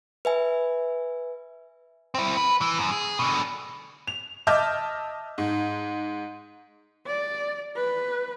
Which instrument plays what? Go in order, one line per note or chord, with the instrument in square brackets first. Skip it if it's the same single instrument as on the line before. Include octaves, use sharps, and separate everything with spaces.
[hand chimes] B4 E5 G#5
[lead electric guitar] C4 E4
B4
E3
F#2
G#4
B2 D3
[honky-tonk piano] F7
D#5 E5 A5 D6 F6 G6
G#2
[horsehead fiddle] D5
B4